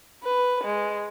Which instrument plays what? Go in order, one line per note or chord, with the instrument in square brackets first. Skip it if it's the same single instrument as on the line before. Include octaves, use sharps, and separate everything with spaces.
[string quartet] B4
G#3